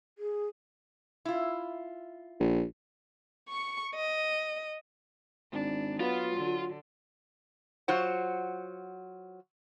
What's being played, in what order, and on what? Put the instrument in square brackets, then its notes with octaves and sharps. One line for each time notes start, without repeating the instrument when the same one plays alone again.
[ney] G#4
[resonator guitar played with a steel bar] E4 F4
[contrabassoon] A#1
[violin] C#6 C#7
D#5
[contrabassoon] G#1 [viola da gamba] D4
[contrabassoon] F#3 [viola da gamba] B3 [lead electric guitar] F4
[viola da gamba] D3
[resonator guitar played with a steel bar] F#3 F4 C5 F#5